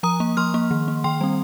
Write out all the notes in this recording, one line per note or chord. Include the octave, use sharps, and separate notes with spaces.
F3 A#5 D#6
A#3
F3 C6 F6
A#3
D#3
A#3
D#3 G5 C6
G3 C4